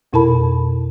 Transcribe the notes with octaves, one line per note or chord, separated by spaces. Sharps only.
F2 B2 E4 A#4 A5 B5